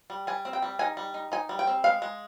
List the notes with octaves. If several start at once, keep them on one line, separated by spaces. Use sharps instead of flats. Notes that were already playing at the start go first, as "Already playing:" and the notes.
G3
G3 G#5
C4
G5
G3
D#4 G#5
G3
D#4
D#4 G#5
G3
G5
C4
G#3 F5
G#3